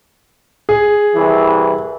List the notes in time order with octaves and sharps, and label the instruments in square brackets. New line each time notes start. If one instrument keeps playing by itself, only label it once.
[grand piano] G#4
[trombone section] C2 E3